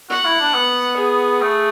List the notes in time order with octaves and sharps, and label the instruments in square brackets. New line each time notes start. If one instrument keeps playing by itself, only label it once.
[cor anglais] F#4 [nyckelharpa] F#5
[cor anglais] E4
D4
B3
[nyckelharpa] G#4
[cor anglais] A3